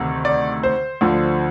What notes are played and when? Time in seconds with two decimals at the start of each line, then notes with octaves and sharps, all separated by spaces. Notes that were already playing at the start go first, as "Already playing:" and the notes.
Already playing: D2 C3 D#3
0.25 D5
0.63 C5
1.01 D2 D3 F3